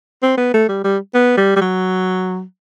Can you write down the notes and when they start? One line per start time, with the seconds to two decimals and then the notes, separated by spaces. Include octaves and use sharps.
0.22 C4
0.37 B3
0.54 A3
0.68 G3
0.84 G3
1.14 B3
1.37 G3
1.56 G3
1.61 F#3